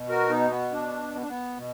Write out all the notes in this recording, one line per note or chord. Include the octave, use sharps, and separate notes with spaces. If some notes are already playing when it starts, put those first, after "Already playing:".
Already playing: B2
F#4 A#4
B3 D#4
B3
D4
B3
D4
B3
B2